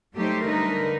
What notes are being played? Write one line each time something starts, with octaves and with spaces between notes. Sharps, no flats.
F#3 G3 A3 D#4 G4 C5
D3 D#4 A#4 B4